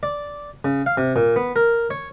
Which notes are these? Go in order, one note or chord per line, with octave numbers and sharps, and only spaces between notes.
D5
C#3
F5
C3
A#2
B3
A#4
C#5